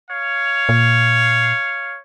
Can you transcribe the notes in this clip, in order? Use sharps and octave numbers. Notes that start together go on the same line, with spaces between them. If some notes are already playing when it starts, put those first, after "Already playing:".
C#5 F5
A#2